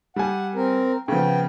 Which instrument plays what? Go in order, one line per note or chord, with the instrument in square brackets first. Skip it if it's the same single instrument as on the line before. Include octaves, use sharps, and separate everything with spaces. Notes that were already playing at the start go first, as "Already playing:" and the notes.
[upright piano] G3 G#5 [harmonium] F#5
[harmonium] C4 A#4
[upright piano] C#3 F3 [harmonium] B3 G5